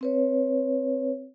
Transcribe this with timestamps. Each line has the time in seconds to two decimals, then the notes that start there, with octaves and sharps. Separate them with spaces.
0.01 C4 B4 C#5